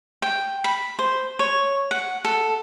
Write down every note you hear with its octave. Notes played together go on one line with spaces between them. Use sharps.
G5
B5
C5
C#5
F#5
A4